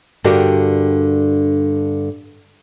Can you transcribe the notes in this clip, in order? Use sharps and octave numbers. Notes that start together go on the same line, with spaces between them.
G2 D3 D4 F#4 G4 A#4